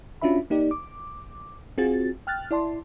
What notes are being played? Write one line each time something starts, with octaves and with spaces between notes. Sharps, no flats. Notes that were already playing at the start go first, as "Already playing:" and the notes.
C#4 D4 F4 F#4 E5 B5
A#3 D#4 G4 D5
D6
C4 F4 F#4 G#4 A6
G5 F6 F#6 A6
E4 D5 A5 C6